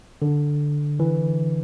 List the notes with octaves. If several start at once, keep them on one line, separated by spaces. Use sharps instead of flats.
D3
E3